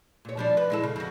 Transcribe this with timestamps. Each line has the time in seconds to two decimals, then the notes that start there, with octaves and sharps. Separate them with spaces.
0.25 A#2 C#5
0.37 F3 G3 D4
0.57 B4
0.70 G#3 E4 A4
0.83 C#3
0.96 F2 F#4